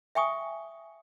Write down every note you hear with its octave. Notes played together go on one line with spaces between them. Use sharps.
E5 G5 G#5 C#6 D#6